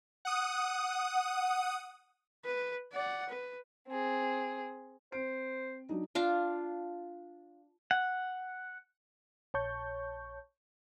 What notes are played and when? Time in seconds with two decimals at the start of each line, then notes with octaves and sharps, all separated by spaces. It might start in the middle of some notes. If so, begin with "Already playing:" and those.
0.25 F#5 D#6
2.45 B4
2.93 D5 F#5
3.29 B4
3.89 C4 G#4
5.12 C4 C5 D7
5.89 F#3 D4 D#4
6.15 D4 F4 F5
7.91 F#5
9.54 A#1 C#5 A5 C#6 G6